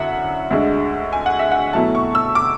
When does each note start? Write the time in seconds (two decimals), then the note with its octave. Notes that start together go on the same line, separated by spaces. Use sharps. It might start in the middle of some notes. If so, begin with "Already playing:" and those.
Already playing: F#2 D3 F#3 E4 E5 F#5
0.51 D2 D3 G#3
1.13 G#5
1.26 F#5
1.39 E5
1.52 F#5
1.73 B2 F#3 A3 E4 A5
1.95 C#6
2.15 E6
2.35 D6